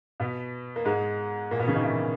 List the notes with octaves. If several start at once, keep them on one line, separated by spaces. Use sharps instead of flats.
B2 B3
A#3
G#2 G#3
A#2 A#3
B2 B3
C#3 C#4
D#3 D#4
E3 E4